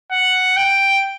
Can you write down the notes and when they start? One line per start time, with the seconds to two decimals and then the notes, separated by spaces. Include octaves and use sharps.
0.12 F#5
0.57 G5